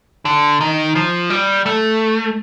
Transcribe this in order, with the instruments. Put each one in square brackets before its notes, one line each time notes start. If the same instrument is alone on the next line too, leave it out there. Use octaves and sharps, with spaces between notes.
[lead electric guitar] D3
D#3
F3
G3
A3